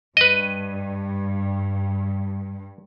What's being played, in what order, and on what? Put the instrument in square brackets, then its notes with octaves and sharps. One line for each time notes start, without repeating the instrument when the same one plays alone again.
[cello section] G2 [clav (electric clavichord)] B4 D#5